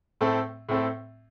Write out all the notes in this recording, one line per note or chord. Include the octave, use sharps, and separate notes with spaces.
A2 A3 C4 A4
A2 A3 C4 A4